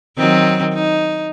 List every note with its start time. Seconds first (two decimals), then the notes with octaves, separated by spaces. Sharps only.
0.17 D#3 F#3 C4
0.74 D#4